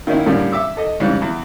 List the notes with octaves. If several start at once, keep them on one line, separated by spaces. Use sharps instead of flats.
D#3 A#3 C#4 D#4 E4
A2 D3 G3 A#3 C#4
E5 D6 E6
A4 D#5
G#2 C#3 E3 G3 C#4
E2